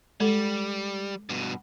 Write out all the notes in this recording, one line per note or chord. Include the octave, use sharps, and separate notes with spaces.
G3 G#3 A4
G2 B2